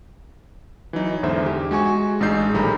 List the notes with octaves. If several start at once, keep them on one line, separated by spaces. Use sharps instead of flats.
E3 F#3 D#4
E2 G#2 D3 C5 E5
G4
G#3 F#4 G#5 C#6
A1 G#3 D4 D#4 G6 C7
A#1 D#3 G3 A4 A#5 B5